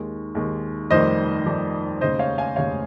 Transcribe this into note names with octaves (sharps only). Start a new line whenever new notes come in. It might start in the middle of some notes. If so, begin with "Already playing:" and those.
Already playing: D#2 D#3 G#3
D#2 D#3 G#3
F1 F2 D#3 G3 C5 D#5
F1 F2 D#3 G3
F1 D#2 C#3 G#3 C5 D#5
C#5 F5
F5 G#5
F1 D#2 C#3 G#3 C#5 F5